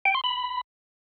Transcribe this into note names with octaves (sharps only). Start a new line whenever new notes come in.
G5
C6
B5